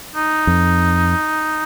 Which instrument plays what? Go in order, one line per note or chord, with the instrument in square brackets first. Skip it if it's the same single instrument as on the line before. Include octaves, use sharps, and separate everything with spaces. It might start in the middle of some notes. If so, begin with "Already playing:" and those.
[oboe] D#4
[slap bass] F2